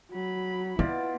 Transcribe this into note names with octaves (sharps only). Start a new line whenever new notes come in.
F#3 B5
B2 B3 E4 F4 D5